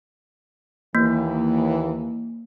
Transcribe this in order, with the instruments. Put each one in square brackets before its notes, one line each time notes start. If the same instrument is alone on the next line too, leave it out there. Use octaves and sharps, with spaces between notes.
[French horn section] D#2 E3 [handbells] A#3